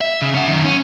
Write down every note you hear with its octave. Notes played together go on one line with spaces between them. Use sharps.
E5
C#3
C#4 F#5
F#2 D#3
C#4